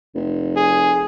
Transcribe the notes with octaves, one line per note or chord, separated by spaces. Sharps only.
F1
G#4